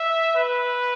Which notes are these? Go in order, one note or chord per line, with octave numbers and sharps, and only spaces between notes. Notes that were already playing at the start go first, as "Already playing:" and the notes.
Already playing: E5
B4